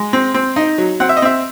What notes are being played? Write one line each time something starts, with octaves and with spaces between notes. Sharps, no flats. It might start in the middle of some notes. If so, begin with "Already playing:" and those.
Already playing: G#3
C4
C4
D#4
F#3
C4 F#5
E5
D#5
C4 E5